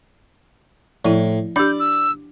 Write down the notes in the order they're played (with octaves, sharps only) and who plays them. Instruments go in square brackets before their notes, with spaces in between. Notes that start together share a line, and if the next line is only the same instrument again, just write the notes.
[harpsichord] A2 [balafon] F3 E4
[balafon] D4 G4 [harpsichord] D5 [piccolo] G6
[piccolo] E6